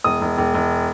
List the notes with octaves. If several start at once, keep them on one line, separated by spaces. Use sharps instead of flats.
E1 D#6
E1
E1
E1